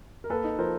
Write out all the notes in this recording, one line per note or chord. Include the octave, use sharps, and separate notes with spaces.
A#4
A#3 A4 B4
D#4
F3 A#4 C5